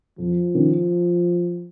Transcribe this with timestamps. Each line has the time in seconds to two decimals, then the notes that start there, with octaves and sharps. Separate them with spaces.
0.18 F2 F3
0.55 D#3 C#4